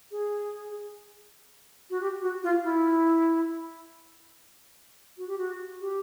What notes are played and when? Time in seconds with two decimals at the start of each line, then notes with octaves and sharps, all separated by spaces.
0.11 G#4
1.90 F#4
2.01 G4
2.22 F#4
2.43 F4
2.64 E4
5.18 F#4
5.28 G4
5.38 F#4
5.80 G4